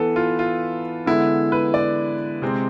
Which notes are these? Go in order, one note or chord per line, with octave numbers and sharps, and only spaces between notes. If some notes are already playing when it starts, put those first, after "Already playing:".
Already playing: E3 B3 A4 B4
F4
F4
D3 G#3 B3 E4
B4
D5
C3 G#3 C4